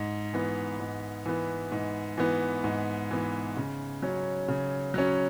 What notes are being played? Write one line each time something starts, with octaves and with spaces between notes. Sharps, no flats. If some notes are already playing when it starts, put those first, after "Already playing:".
Already playing: G#2
E3 B3
G#2
E3 B3
G#2
E3 B3
G#2
E3 B3
C#3
F#3 C#4
C#3
F#3 C#4